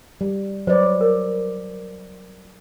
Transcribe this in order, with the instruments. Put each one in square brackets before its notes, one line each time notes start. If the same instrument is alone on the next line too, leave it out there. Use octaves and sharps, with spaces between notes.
[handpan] G3
[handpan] F#3 B4 D5 [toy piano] C5
[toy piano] A#4